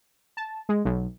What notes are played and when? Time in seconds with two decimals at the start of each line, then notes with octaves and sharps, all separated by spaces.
0.37 A5
0.69 G#3
0.85 B1